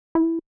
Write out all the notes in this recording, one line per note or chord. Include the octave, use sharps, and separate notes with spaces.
E4